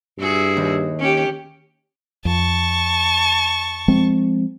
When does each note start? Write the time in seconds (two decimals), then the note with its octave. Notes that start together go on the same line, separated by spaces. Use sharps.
0.18 G2 E4 F#4 G#4
0.57 D#2
0.99 C#4 G4
2.25 F2 A5 C#6
3.88 F3 G#3 C4